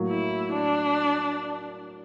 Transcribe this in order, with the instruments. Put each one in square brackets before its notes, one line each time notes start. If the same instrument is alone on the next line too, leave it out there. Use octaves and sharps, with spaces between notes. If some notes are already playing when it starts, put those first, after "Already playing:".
Already playing: [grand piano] A2 F#3 A#3
[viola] E4
D4